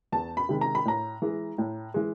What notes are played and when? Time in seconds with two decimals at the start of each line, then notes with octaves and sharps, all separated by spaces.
0.12 E2 A5
0.37 B5
0.49 C3 D#3 G#3
0.61 A#5
0.75 B5
0.85 A2 A#5
1.22 E3 G#3
1.58 A2
1.94 E3 G#3